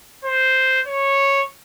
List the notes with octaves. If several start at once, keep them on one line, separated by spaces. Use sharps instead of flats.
C5
C#5